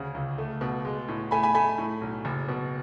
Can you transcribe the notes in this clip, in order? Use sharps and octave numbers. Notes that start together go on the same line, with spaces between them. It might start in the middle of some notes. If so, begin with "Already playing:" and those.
Already playing: D2 C#3
C#2
A3
B2
G#3
A2
A3 G#5 B5
G#5 B5
A3 G#5 B5
A2
B1
F#1
B2